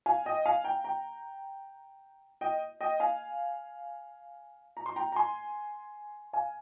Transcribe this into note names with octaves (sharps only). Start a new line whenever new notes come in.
F5 G#5
D#5 G5
F5 G#5
G5 A#5
G5 A#5
D#5 G5
D#5 G5
F5 G#5
A#5
C6
G5 A#5
A#5
G#5 C6
F5 G#5